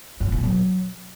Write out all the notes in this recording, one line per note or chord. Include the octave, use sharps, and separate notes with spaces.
G2
A#2
F#3